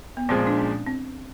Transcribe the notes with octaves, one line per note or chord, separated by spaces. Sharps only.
B3
A#2 F3 G#3 C4
D4
C#4
C4